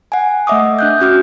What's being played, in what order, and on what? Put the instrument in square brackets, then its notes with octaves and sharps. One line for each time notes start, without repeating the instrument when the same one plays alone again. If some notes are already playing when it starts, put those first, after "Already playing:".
[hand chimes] F#5 G#5
A3 D#5 E5 D6 D#6
D4 F#6 G6
C#4 F#4 D6 F6